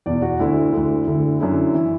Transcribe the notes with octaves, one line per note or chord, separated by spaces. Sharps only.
E2 B2 D5
F#4
D2 D3 E4
D2 D3
D2 D3
F#2 D3 E4
E3 E4